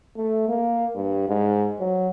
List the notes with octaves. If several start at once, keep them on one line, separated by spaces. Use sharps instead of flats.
A3
A#3
G2
G#2
F#3